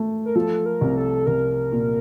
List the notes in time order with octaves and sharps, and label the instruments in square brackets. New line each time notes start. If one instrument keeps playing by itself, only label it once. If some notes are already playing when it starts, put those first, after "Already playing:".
Already playing: [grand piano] A3
[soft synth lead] A#4
[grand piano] F3 [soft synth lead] A4
[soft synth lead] A#4
[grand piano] C2
[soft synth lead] A4
[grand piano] C2 [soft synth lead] A#4
[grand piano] A#2